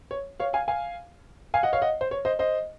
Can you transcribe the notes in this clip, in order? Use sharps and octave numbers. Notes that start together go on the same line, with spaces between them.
C#5
C#5 F5
F5 G#5
F5 G#5
F5 G#5
D#5 F#5
C#5 F5
D#5 F#5
C5
C#5
C5 D#5
C5 D#5